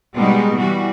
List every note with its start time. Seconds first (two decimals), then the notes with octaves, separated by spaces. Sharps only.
0.17 B2 G3 G#3 B3 D#4
0.58 E3 G3 F#4